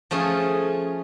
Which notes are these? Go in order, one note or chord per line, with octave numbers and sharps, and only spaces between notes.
F3 A3 C#4 G#4